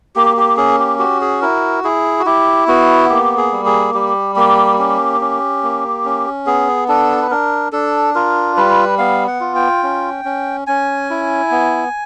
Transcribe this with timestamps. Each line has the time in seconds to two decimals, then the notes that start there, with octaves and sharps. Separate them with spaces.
0.16 A#3 G4
0.37 G4
0.57 C#4 G#4
0.79 G4
0.99 F#4 G4
1.21 G#4
1.41 E4 A#4
1.84 E4 G#4
2.20 F#4
2.26 E4 G4
2.68 B3 F#4
3.09 A#3 G4
3.37 G#4
3.52 G3
3.66 G#4
3.94 G3 G4
4.36 A#3 G4
4.78 C#4 G4
5.21 C#4
5.63 A#3
6.05 C#4
6.46 B3 G#4
6.88 D4 A4
7.22 B4
7.31 D4 A#4
7.72 D4 A4
8.15 F4 A#4
8.57 G3 B4
8.98 B3 F5
9.27 F#5
9.41 F4
9.56 G5
9.83 C#4
10.25 C#4
10.67 C#4 G#5
11.10 E4
11.51 B3